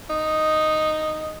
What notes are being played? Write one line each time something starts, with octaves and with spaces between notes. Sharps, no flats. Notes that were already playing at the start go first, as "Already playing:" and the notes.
D#4